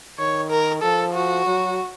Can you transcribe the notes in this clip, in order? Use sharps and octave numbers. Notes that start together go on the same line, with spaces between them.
D#3 C#5
A#4
F3 A4
F#4
F#3